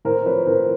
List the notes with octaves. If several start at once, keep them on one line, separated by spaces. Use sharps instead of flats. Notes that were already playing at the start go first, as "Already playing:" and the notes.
A2 A#4 C5
F3 B4 C#5
A2 A#4 C5